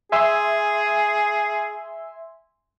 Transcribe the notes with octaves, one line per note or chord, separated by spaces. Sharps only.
G#4 E5 G#5 C6